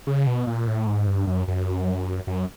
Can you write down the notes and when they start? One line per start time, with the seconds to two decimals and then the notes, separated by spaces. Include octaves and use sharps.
0.07 C#3
0.27 B2
0.47 A#2
0.67 A2
0.87 G#2
1.07 G2
1.27 F#2
1.48 F#2
2.27 F#2